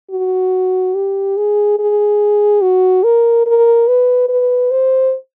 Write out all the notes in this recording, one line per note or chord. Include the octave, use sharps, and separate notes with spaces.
F#4
G4
G#4
G#4
F#4
A#4
A#4
B4
B4
C5